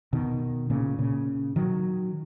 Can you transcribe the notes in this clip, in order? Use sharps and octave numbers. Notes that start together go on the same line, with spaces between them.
B2 D#3
A#2 C#3
A#2 C#3
D#3 F#3